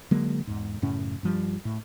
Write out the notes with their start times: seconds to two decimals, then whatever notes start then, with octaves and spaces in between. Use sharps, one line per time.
0.11 D3 F#3 G#3 A#3
0.47 E2 G#2
0.82 F#2 A2 C#3 C#4
1.23 G2 F3 G3
1.65 A2